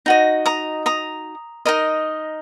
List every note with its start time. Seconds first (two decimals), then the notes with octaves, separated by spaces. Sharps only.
0.06 D#4 F#4 D#5
0.46 A#5 D#6
0.86 A#5 D#6
1.65 D#4 A#4 D#5